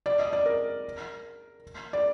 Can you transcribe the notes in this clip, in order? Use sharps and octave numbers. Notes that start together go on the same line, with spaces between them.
D5
D#5
D5
A#4
D5